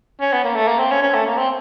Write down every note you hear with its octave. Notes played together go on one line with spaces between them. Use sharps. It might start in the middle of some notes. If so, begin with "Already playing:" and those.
C#4
B3
A#3
A3
A#3
C4
C#4
C#4
A3
A#3
C4